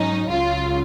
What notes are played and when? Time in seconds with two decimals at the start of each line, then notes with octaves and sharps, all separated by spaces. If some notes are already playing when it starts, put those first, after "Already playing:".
Already playing: G#2 F#3 C#4 D#4
0.30 C#2 C#3 F#3 F4